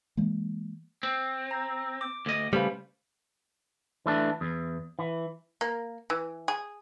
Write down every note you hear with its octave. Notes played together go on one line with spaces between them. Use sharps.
E3 G#3 A#3
C4
A#5
D6
D2 D#5
C#3 G3 A3 B4 C5 F5
E3 A3 D4
E2
E3
A#3
E3
G#4